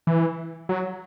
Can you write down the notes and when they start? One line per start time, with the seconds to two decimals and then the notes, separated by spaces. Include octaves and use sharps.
0.07 E3
0.69 F#3